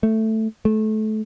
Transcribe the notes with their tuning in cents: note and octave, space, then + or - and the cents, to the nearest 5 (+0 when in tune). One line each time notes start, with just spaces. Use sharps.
A3 +5
A3 -25